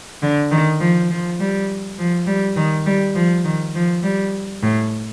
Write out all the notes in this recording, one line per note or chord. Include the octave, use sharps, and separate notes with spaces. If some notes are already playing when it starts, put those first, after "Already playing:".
D3
D#3
F3
F3
G3
F3
G3
D#3
G3
F3
D#3
F3
G3
A2